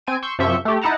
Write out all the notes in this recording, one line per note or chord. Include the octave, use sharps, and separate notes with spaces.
C4 G#5 D7 D#7
C6 C#6 E6 G6
F#2 C3 F3 E5 C#6 G6
A3 G4
D#4 E4 F#5 A5 A#5